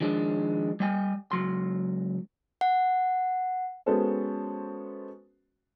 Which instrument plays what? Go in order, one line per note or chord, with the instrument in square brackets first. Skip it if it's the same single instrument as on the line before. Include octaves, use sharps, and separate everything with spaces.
[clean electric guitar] D#3 F3 G#3 D4
G3 D#5 G5 G#5
C#2 F#3 C6
[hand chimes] F#5
[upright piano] G#3 B3 C#4 F#4 A4 C5